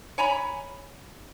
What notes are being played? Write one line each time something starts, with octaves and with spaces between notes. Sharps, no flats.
C#5 G#5 A#5 B5